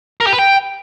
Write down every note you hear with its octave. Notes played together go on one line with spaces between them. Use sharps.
A#4
G4
B4
G5